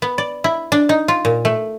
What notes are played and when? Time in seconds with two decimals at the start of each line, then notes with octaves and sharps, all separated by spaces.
0.02 B3
0.18 D5
0.44 E4
0.72 D4
0.89 D#4
1.08 F4
1.25 A#2
1.45 A3